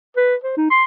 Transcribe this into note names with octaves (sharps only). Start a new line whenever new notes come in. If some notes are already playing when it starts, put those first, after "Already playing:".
B4
C5
D#4
C6